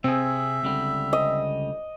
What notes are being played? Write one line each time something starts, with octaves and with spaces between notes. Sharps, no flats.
C3 C4 G#4 E5
C#2 D3 G3
D#5